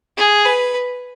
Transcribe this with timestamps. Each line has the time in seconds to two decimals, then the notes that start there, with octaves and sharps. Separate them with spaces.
0.17 G#4
0.46 B4